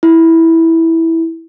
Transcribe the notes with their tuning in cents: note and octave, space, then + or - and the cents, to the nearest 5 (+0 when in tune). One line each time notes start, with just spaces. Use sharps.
E4 -10